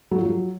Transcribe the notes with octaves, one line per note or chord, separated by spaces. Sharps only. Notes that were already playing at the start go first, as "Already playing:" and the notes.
F#3
F3
F#3